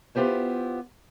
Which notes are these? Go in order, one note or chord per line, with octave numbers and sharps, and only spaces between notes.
B3 E4 F4 G4 C5 C#5